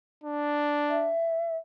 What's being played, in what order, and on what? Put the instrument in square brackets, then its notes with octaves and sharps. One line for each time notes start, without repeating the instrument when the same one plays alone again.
[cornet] D4
[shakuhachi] E5